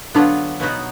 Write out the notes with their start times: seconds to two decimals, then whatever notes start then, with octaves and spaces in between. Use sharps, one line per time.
0.15 D3 F#3 B3 D4 F4
0.60 B2 F#3 B3 D#4 F#4